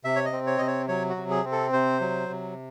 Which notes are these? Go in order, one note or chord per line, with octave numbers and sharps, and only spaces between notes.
C3 E5
C#5
D#5
C4
C#5
C3 D#5
C#5
F#3 C#5
F#4
C3
G#4
C4
A4
C3 C5
F#3
C3